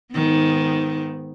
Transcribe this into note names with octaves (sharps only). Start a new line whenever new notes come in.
G#2 D#3 B3